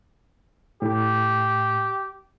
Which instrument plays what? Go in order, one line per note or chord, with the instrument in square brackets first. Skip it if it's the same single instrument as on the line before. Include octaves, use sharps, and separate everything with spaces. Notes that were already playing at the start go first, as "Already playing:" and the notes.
[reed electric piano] A2 [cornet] G4